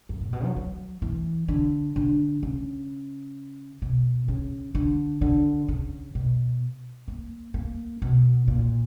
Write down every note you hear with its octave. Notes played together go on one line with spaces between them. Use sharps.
F#2
A#2
B2
F#3
F#3
E3
D3
D3
C#3
B2
C#3
D3
D3
C#3
B2
A#3
A#3
B2
A#2